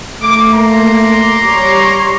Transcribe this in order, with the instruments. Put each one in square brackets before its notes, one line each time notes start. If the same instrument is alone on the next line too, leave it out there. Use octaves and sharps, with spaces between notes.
[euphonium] A3 [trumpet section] A#3 D6
[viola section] A#3 [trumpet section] A#5 C6 D6
[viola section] G3 C#5